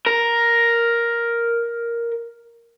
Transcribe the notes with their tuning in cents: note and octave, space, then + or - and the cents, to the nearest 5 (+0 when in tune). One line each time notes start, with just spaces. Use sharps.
A#4 +5